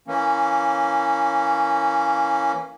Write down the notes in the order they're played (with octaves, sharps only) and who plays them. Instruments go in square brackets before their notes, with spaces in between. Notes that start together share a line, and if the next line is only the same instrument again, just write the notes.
[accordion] E3 A#3 C#4